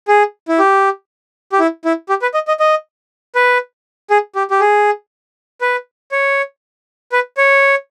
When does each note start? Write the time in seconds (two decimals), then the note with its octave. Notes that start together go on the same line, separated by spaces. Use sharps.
0.08 G#4
0.48 E4
0.59 G4
1.52 G4
1.59 E4
1.85 E4
2.09 G4
2.22 B4
2.34 D#5
2.48 D#5
2.60 D#5
3.35 B4
4.10 G#4
4.35 G4
4.51 G4
4.60 G#4
5.61 B4
6.12 C#5
7.12 B4
7.37 C#5